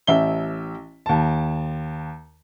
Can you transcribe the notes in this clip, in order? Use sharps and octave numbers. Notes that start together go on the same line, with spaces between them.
A1 E5 G7
D#2 A5